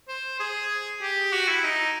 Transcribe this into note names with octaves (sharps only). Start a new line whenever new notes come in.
C5
G#4
G4
F#4
E4
D#4